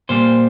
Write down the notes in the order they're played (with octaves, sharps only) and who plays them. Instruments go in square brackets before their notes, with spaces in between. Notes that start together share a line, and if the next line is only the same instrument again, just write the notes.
[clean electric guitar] A#2 G3 A#3 C5